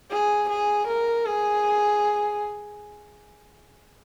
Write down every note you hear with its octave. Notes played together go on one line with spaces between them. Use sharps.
G#4
G#4
A#4
G#4